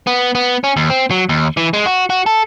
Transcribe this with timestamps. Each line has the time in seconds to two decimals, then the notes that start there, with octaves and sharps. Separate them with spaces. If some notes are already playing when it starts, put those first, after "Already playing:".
0.07 B3
0.35 B3
0.64 C#4
0.76 D#2
0.90 C4
1.11 F#3
1.29 D#2
1.57 E3
1.74 G#3
1.86 F#4
2.10 F#4
2.26 A4